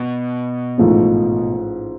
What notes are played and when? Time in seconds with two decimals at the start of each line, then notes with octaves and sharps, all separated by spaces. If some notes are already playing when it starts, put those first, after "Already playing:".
Already playing: B2
0.78 A1 G#2 F3 A3 C4